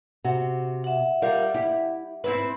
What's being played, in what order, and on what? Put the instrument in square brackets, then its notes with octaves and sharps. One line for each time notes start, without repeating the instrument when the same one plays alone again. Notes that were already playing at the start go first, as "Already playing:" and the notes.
[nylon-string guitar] C3 F#4
[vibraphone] E5 F#5
[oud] G3 [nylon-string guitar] F4 A#4 F5
[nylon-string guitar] E4 [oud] G4
[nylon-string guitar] G#2 [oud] C4 E4 B4